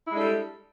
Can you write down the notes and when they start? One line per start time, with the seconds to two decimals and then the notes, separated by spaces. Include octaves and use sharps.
0.06 E4
0.09 G#3
0.13 D4
0.17 A4
0.20 G3